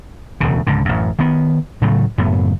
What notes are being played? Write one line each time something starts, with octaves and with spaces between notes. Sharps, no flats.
E1 D2 C#3
C#2 G#2 D3
A1 F#2
D#3 B3
A2 C#3 F#3 A3
F#1 F#2 A2 B3